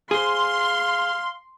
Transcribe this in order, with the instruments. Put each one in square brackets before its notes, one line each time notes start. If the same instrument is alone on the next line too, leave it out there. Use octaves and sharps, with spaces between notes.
[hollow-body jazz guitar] G#4 C5 [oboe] F5 [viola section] C6